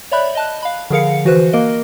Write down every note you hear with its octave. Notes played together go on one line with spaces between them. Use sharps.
C#5 D5 E5 B5 F#6 G6
D#5 A5 F#6
F5 B5
D3 F3 G#4 A#4 F5 C#7
E3 F#4 B4 C5 F#6
A#3 A#4 D#5